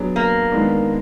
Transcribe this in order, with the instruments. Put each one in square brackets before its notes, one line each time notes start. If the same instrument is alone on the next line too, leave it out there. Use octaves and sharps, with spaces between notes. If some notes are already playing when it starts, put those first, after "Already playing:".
Already playing: [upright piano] F#3 B3 D4 G#4 D5
[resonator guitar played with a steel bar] A#3
[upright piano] D#3 G#3 B3 D4